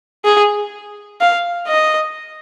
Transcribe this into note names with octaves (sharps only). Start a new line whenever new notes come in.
G#4
F5
D#5